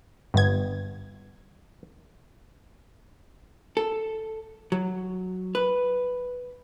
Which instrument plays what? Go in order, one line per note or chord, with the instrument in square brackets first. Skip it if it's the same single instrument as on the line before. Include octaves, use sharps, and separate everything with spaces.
[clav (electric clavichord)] G1 B3 [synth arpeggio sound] G2 G#6
[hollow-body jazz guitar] A4
F#3
B4